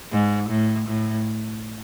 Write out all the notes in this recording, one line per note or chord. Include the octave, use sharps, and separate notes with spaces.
G#2
A2
A2